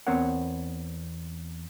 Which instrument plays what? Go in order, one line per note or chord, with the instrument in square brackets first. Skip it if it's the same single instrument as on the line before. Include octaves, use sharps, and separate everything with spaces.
[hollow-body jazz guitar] E2 B3 C4 A#4 C#5 F#5